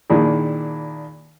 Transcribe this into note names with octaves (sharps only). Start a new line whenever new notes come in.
A#2 D#3 D4 E4 G#4